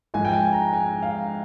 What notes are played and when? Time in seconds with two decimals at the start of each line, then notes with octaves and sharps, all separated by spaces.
0.14 G#2 F3 G#3 G#5
0.25 G5
0.33 G#5
0.53 A#5
0.73 G#5
1.02 F5